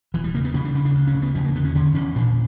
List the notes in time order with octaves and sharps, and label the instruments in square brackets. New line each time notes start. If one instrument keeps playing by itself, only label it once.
[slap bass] E1 E3
G3
C#3 A#3
B3
C#3 C#4
D4
C#3 C#4
D4
D2
C#4
C#3
B3
E2 C#4
A#3
D3 B3
C#4
D3 C#4
E2 C#4
A#2 D4